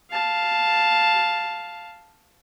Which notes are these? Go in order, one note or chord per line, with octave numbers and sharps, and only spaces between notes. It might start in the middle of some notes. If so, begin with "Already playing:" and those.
F5 A5